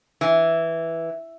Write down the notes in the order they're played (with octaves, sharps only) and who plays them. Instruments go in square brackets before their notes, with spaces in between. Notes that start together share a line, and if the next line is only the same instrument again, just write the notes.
[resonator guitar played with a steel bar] E3